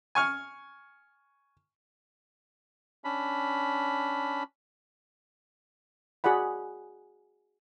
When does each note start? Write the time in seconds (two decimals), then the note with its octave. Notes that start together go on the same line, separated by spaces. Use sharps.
0.15 G#5 C#6 F6
3.04 C#4 D4 B5
6.24 F#4 G#4 D5 F#5 B5